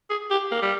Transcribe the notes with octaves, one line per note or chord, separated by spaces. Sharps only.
G#4
G4
A#3
G3